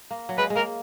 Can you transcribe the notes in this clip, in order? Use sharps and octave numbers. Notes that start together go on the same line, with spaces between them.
A#3
F#3
G#3 B4
G#3
A#3 A#4